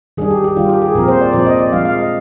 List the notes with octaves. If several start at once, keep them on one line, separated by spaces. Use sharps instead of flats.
D#3 G3 D4 G#4
G4
G4
D#3 G3 D4 F4
G4
G#4
A#2 F3 C4 A#4
C5
D5
A#2 F3 C4 D5
D#5
D5
F3 G#3 D4 F5
F5
D#5